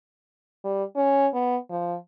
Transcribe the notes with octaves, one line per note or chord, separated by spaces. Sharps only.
G3
C#4
B3
F3